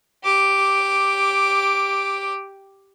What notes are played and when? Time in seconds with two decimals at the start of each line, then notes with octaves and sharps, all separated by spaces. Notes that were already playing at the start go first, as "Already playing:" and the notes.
0.24 G4 D6